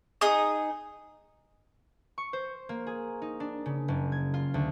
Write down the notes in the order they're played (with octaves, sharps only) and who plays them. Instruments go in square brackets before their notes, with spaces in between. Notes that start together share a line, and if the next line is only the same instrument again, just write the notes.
[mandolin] D#4 G#4 D#6
[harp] C#6
C5
A#3
G#4
D#4
D4
C#3
F#1
G#6
F4
D2